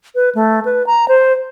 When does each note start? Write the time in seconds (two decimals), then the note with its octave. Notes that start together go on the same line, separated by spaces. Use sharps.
0.15 B4
0.35 A3
0.65 B4
0.87 A#5
1.08 C5